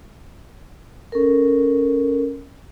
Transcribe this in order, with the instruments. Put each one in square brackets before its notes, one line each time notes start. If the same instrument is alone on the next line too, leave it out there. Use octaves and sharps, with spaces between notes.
[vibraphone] C#4 A4 A#4